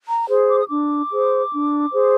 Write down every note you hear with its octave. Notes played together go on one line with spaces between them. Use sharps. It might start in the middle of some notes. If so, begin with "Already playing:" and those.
A#5
G#4 C5
D6
D#6
D4 D6
G#4 C5
D4
G#4 C5